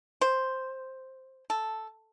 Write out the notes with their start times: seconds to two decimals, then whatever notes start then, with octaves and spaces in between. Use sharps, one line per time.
0.21 C5
1.50 A4